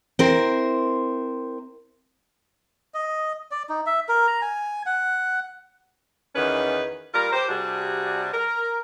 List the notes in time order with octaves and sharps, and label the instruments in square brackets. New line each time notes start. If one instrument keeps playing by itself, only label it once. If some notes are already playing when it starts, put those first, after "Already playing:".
[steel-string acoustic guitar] C4 E4 A#4 C5
[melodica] D#5
D5
D#4
E5
A#4
A#5
G#5
F#5
[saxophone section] E2 D#3 B3 C#4 B4
G3 F4 A#4
G4 C5
C3 G3 D4 F#4 G#4
A#4